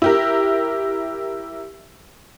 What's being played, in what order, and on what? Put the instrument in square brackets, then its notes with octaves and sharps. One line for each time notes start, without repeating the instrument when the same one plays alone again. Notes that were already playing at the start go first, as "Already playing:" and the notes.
[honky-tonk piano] E4 G4 A#4